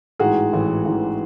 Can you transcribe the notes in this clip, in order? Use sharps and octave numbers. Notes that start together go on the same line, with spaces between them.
A1 G#2 E3 F#4 G#4
A1 G#2 E3
A1 G#2 E3